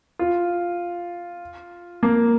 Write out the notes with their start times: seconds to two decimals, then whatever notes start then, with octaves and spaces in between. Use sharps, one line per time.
0.19 F4
2.03 A#3